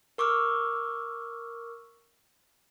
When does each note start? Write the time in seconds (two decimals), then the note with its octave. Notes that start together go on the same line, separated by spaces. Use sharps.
0.18 A#4 C#6 D6 E6 F6